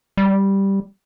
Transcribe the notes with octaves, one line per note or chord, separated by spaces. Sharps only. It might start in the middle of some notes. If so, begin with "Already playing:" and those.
G3